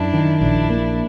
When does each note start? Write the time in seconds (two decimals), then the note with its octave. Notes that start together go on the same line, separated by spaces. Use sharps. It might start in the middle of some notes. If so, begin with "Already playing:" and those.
Already playing: F#2 D4 E4
0.13 D#3
0.41 A#1 D4 E4
0.70 A#3